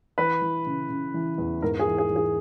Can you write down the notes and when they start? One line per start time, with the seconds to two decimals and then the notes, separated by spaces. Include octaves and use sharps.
0.18 E3 B4
0.42 E3
0.66 C#3
0.89 C#3
1.14 E3
1.38 E2
1.62 G#2 A#4
1.79 G#4
1.87 E3
1.98 G#4
2.10 E3
2.16 G#4